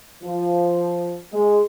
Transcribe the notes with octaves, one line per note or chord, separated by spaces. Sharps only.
F3
G#3